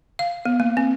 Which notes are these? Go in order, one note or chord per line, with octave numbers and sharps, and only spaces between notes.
F5
B3
A#3
C4